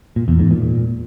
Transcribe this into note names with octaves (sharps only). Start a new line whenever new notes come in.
A#2
E2
G#2
A#2